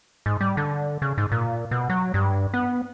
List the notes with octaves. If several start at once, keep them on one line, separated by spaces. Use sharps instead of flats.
G#2
G3
D3
C#3
G#2
A#2
B2
F#3
G2
B3